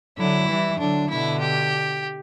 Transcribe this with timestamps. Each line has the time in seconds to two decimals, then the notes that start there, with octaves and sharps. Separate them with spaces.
0.18 D3 F#3 E4
0.48 E3 G3
0.79 D3 F#3 D4
1.10 B2 D3 E4
1.40 G4